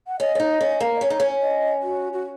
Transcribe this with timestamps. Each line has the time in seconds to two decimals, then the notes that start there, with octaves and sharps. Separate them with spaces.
0.07 F#5
0.20 C#4 D#5
0.35 C#4
0.40 D#4
0.61 C#4
0.80 A#3
0.96 D#5
1.01 C#4 C#5
1.10 D#4
1.20 C#4
1.42 D#5
1.83 F#4
2.13 F#4